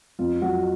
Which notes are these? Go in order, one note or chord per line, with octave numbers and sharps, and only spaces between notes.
F2 F4
F#3 F#4